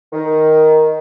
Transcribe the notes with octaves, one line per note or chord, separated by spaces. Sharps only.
D#3